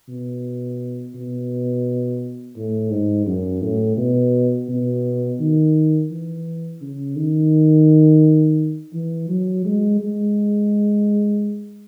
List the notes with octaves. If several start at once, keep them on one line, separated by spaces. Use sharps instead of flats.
B2
B2
A2
G#2
F#2
A2
B2
B2
D#3
E3
C#3
D#3
E3
F#3
G#3
G#3